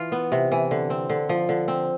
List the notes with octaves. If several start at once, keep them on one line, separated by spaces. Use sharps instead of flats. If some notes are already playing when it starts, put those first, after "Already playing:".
Already playing: E3 F4
B3
C3
E3
D3
C4
D3
F3
D3
C4